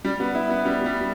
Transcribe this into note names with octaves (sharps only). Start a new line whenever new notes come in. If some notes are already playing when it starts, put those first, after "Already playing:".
G3
B3
E4
B3
G3
G3